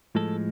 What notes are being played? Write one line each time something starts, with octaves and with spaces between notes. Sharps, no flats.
A2 F3 G#3 A4